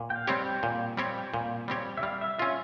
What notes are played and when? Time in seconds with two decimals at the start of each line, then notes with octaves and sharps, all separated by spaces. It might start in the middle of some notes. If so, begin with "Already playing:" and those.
Already playing: A#2
0.10 G5
0.16 F5
0.27 G3 C4 G4 C#5
0.39 G5
0.63 A#2
0.97 G3 C4 G4 C#5
1.34 A#2
1.68 G3 C4 G4 C#5
1.97 E5
2.03 G3 F5
2.21 E5
2.39 C#4 F4 E5